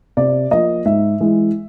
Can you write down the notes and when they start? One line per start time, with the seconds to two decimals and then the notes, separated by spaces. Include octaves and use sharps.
0.17 C3 D5
0.51 F3 A#3 D#5
0.85 G#2 E5
1.20 E3 G#3